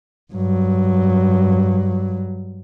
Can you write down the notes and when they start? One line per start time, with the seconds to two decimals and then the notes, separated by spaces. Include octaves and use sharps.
0.33 G2 F#3